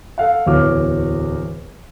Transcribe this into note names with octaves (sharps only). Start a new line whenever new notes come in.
A4 F5 F#5
D1 E2 F#4 C#5 D6 F6